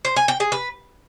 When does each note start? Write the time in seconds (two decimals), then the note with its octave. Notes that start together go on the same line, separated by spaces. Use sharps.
0.05 C5
0.16 G#5
0.28 G5
0.40 G#4
0.52 B4